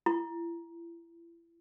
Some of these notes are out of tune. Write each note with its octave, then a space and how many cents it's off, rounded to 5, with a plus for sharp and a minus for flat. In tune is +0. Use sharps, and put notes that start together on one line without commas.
E4 +35